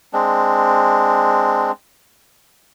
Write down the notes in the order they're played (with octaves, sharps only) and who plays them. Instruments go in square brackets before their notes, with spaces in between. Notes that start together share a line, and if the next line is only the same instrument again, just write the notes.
[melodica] G#3 C4 D4